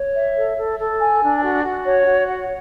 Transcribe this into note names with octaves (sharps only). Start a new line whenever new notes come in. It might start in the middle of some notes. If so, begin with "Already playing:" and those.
Already playing: C#5
E5
A4
A4
A4
G#5
D4
F#4
F#4
C#5
F#4
F#5